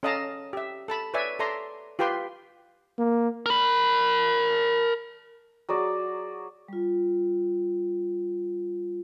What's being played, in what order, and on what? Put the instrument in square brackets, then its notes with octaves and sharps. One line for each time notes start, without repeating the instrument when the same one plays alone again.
[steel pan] C#4 A4 D#5 F5 A5 A#5
G4 E5
A4 A5 B5
B4 C#5 D5 E5 G#5
A4 D5 E5 A#5 C6
F4 G4 B4 G5 C6
[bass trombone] A#3
[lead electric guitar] A#4 B5
[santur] F#3 G#4 D5
[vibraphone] G3 F4